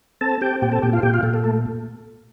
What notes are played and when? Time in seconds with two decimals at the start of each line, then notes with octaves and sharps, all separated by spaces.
0.21 C4 A4 A5
0.41 C4 G4 G5
0.62 A#2 G4 G5
0.72 A4 A5
0.82 A#2 G4 G5
0.93 F4 F5
1.02 A#2 G4 G5
1.14 F4 F5
1.23 A#2 A4
1.34 A4
1.44 A3 A4